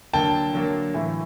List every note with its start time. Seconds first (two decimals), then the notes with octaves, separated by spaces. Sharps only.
0.13 D3 F#3 A#3 G5 A5
0.53 D3 F#3 A#3
0.94 A2 E3 A3